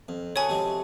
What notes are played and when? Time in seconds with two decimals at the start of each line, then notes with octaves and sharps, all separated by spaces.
0.08 F2
0.36 F#4 G#4 A4 B4 C#5 G#5 B5 C#6
0.49 C3 F3 G#3